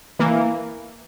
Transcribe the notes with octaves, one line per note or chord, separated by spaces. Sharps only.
E3 A#3